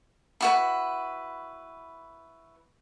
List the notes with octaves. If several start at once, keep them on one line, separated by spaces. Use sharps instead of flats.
E4 F#4 B4